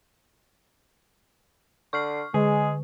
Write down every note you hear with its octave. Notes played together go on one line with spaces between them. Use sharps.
D3 C#6 F6 C7
D3 G#3 G#4